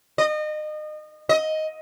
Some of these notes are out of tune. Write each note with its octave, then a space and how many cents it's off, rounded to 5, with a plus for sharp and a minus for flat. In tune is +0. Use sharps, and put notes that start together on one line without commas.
D#5 -30
D#5 +10